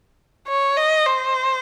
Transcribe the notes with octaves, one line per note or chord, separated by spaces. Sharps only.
C#5
D#5
C5